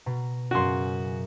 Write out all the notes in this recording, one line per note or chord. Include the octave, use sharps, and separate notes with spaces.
B2 A#5
F#2 C#3 F#4 C6